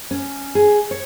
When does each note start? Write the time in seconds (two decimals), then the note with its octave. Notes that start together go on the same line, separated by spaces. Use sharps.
0.11 C#4
0.55 G#4
0.91 C#5